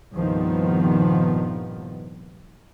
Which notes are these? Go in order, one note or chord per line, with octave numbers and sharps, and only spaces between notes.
C2 G2 A#2 D#3 F3 B3